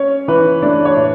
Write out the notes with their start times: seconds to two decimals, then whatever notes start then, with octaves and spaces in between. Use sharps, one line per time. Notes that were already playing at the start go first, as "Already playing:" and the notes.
Already playing: C#4 C#5
0.28 E3 B4
0.62 A3 D4 D5
0.85 C#5
0.96 A2